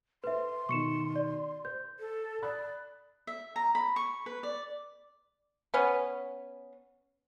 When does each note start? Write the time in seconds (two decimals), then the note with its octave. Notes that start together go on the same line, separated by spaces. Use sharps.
0.24 A4 B4 C5 E5 C6
0.69 B2 D#3 C#6 C#7 E7
1.16 D5
1.65 C5 G6
2.00 A4
2.42 D5 B5 D#6 F#6
3.27 E5
3.56 A#5
3.75 B5
3.96 C#6
4.26 B4
4.43 D5
5.74 B3 C#4